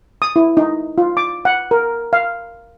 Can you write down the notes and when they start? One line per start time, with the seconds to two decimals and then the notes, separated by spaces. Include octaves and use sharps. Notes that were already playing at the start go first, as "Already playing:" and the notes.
0.22 D#6
0.36 E4
0.57 D#4
0.98 F4
1.17 D6
1.45 F#5
1.71 A#4
2.13 F5